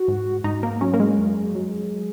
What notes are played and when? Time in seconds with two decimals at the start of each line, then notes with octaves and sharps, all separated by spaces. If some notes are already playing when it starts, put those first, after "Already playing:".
Already playing: F#4
0.08 G#2
0.44 G#2 D#4
0.63 A#3
0.81 F#3 C#4
0.94 A#3
1.00 G#3
1.19 F#2
1.55 F#3